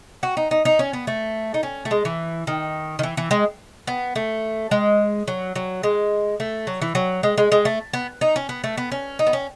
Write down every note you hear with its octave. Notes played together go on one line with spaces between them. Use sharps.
F#4
D#4
D#4
D#4
C#4
B3
A3
D#4
C#4
A3
G#3
E3
D#3
D#3
E3
E3
G#3
B3
A3
G#3
F#3
F#3
G#3
A3
F#3
E3
F#3
G#3
G#3
G#3
A3
B3
D#4
C#4
B3
A3
B3
C#4
D#4
B3
C#4